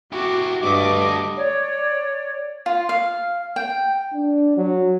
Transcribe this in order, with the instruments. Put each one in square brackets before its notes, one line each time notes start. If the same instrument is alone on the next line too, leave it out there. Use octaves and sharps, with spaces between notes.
[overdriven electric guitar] E4 G4 [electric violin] F#4 D6
[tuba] G2 [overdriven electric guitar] A3 F#4 [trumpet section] D#5 [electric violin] D6
[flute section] C#5 D5
[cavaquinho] F4
F5
G5
[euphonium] D4
F#3